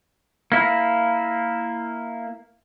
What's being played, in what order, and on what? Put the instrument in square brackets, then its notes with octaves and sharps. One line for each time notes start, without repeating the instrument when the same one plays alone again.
[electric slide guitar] A#3 E4